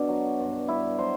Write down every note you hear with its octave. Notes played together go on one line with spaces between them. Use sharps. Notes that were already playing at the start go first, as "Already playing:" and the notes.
Already playing: B2 D4
F#3
G2
G2 E4
F#3 C5